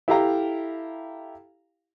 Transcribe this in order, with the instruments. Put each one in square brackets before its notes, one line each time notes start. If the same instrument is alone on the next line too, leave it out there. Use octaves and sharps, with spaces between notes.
[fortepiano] E4 G4 A4 F5 G5 A#5